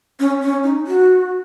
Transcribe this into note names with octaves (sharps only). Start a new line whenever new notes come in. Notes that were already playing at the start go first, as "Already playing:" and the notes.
C#4
C#4
D#4
F#4